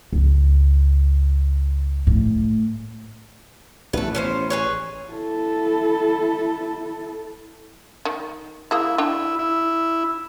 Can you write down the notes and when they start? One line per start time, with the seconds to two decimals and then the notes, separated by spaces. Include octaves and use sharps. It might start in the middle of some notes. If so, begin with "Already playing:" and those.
0.13 C#2
2.07 A2
3.93 A1 A3 B4
4.15 B3 C#4 C5
4.50 G#4 B4 C#5
5.09 E4 A4
8.05 D#3
8.71 G#3 A#3 E4
8.98 D4 E4 G5
9.39 E4